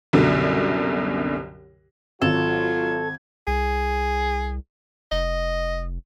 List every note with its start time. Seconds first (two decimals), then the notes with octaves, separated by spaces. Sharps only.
0.13 C2 F#2 B2 D3
2.22 G#1 F#3 F4 A4 G#6
3.47 C2 G#4
5.12 F1 D#5